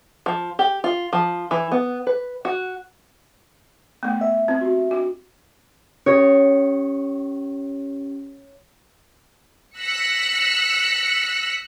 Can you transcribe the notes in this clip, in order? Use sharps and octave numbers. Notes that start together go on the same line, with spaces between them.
F3
G4
F4
F3
E3
B3
B4
F#4
A3 B3
E5
C4 E4
F#4 G4
D4 F#4
C#4 G4 C#5
E6 F#6 A#6 B6 C#7